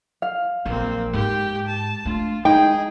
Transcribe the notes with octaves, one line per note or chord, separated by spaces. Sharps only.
F5
A#1 F#3 A#3 C4
G#2 G4 G5
A5
A3 D4 F4
G#3 D#4 G#4 G5